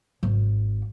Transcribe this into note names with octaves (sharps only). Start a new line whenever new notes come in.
G#1